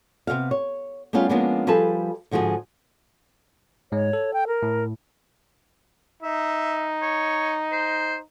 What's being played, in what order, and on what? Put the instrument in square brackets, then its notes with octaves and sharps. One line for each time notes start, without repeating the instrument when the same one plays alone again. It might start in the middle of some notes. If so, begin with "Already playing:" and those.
[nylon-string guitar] C3 E3 B3 F5
C#5
G3 A3 B3 C#4 F4 G#4
F3 G#3 A#3 B3 C#4 D4
F3 G3 G#4 A4 B4 A5
G#2 D3 F3 F#4 G#4
[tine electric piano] G#2 G#3 [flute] C#5
[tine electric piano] A4
[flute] G5
A#4
[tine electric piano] A2
[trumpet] D#4 [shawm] E5
[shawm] C#5
C5